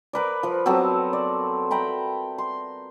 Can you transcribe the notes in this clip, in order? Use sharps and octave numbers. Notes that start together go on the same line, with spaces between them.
A#4 B4 D5
F3 B4
F#3 B3 C4 A4
D5
E5 G5 A#5 B5
C6